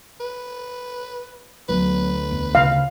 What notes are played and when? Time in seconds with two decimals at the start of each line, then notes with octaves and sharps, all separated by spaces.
0.20 B4
1.69 D2 F#3 B3 B4
2.31 E2
2.55 C#3 F5